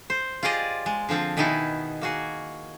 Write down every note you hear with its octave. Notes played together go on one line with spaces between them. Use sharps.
C5
F4 G4 G#4 D5 D#5
G#3
D3 F3 C4 F4
B2 D#3 B3 D#4 E4 G#4
A#3 F#4 G#4